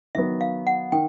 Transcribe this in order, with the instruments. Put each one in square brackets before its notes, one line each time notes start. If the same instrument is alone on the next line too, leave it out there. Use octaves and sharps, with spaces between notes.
[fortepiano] D#3 F#3 B3 [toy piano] E5
[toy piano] F5
F#5
[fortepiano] D#3 [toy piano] G5